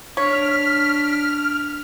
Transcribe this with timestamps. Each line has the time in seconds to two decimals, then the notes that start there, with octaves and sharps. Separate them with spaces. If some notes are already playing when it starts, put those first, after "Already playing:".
0.17 D4 C#5 F6 B6